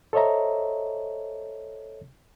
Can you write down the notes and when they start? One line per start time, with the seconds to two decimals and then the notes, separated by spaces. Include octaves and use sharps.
0.13 A4 C5 C#5 D#5 E5 A#5